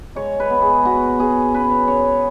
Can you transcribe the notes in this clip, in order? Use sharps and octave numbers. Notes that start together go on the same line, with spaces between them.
G#3 C#5
B4
B3
G#4
B3 F#4
B3 G#4
C#3 B4
C#5
C#3 C#5